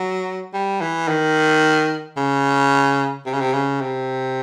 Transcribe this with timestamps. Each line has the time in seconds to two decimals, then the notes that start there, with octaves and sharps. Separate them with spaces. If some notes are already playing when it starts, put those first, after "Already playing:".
Already playing: F#3
0.54 G3
0.81 E3
1.08 D#3
2.17 C#3
3.26 C3
3.33 C#3
3.40 C3
3.53 C#3
3.81 C3